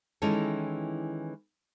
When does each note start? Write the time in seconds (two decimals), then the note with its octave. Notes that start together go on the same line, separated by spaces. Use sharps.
0.22 D#3 E3 G#3 C#4 E4 A4